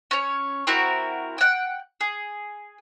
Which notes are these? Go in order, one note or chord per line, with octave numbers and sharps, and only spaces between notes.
C#4 C#5
C4 E4 F#4 A#4
F#5 G5
G#4